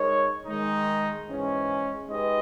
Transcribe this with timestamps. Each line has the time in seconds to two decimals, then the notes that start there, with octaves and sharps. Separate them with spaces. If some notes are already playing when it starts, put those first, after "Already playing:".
Already playing: G#3 D#4 A#4 C#5
0.46 D#3 G#3 D#4
1.28 G#2 E3 G#3 C#4
2.09 G#3 D#4 G4 B4 D#5